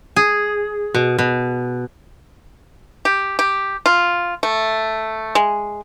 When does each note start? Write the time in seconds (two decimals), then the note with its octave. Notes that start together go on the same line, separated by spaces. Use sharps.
0.16 G#4
0.94 B2
1.18 B2
3.05 G4
3.39 G4
3.86 F4
4.43 A3
5.35 G#3